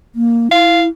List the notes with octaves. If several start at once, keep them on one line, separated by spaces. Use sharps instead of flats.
A#3
E4 F5